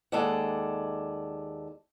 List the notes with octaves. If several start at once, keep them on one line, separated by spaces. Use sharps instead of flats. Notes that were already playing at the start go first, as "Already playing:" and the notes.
D#2 G#3 A4 D5 F#5